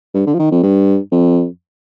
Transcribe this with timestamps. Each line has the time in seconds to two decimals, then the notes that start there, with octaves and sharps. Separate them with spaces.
0.14 G2
0.27 D3
0.34 F3
0.39 D#3
0.51 F2
0.63 G2
1.12 F2